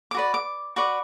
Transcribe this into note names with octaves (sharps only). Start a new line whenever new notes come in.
D6
F#4 B4 D5
D6
F#4 B4 D5 C#6